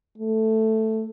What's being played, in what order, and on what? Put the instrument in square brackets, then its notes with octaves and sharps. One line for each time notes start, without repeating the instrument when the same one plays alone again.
[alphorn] A3